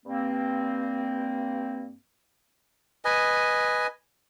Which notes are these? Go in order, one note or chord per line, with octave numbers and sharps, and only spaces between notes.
G2 A#3 C4
B4 D#5 G#5